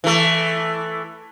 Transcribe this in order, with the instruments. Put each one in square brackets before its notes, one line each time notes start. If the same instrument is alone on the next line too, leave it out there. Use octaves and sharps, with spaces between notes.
[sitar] E3 A3